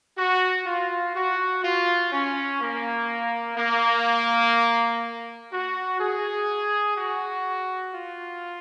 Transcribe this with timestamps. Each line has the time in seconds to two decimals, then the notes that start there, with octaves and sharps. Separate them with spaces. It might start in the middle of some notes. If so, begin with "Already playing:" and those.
0.17 F#4
0.66 F4
1.14 F#4
1.63 F4
2.12 C#4
2.61 A#3
3.57 A#3
5.52 F#4
6.00 G#4
6.97 F#4
7.93 F4